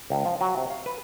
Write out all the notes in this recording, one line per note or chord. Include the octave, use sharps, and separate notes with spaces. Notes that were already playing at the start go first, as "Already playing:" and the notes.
C#2
F3
F#3
C3
F5
B4